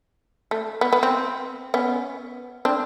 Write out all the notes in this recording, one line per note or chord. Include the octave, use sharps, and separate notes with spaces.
A3
B3
B3
C4
B3 C#4
C4 D4